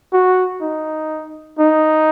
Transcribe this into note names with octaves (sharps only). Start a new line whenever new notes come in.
F#4
D#4
D#4